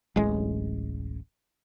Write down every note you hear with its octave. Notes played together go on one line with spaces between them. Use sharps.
D1 A1 G#3